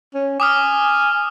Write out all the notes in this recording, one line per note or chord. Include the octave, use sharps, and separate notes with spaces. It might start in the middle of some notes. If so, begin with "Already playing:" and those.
C#4
G#5 D6 D#6 F6